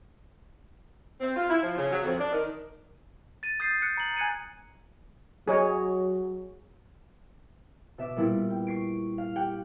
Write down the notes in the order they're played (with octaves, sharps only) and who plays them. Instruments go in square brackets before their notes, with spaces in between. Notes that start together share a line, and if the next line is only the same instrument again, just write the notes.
[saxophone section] C4
F4
E4
F3
C#3
F#3
F2
D4
D#3
[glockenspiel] A6 D#7
D#6 G6 A6 C7
F#6 C#7
A#5 F#7
G#5 F#6 G#6 C#7 D#7
[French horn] F#3 [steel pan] G#4 C#5 D#5
[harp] B2 E5 D6
A#2 G3 B3 E4
G5
C#6 C7 D7
F5
G4 F#5 G5